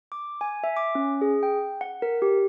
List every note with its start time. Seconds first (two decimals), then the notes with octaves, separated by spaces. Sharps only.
0.12 D6
0.41 G#5
0.64 E5
0.77 D6
0.95 C#4
1.21 G#4
1.43 G5
1.81 F#5
2.02 A#4
2.22 G4